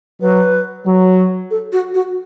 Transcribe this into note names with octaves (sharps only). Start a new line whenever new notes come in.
F#3 B4
F#3
A4
F#4
F#4